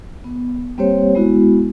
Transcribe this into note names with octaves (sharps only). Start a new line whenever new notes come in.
B3
G3 A#3 C4 G4 C5 C#5
G#3 B3 E4 F#4